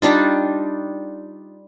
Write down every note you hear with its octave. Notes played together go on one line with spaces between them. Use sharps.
G3 D4 D#4 F4